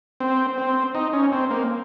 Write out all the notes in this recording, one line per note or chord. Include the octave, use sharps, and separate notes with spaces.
C4
C4
D#4
C#4
C4
A#3